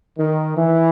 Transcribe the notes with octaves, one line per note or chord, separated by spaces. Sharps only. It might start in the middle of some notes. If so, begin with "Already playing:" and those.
D#3
E3